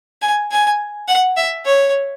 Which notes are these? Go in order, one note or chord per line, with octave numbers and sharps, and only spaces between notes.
G#5
G#5
F#5
E5
C#5